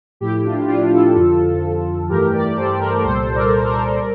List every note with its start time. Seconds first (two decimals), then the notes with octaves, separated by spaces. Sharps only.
0.20 A2 F3 A3 E4 G4
0.44 D4 F4
0.68 D4 F4
0.92 F4 A4
1.16 F2 D3 F3
2.09 G2 E3 A3 G4 A#4
2.33 A#4 D5
2.56 A4 C5
2.80 G4 A#4
3.04 C2 A#2 G3 A4 C5
3.35 A#4 D5
3.66 A#4 D5
3.98 G3 A#4 D5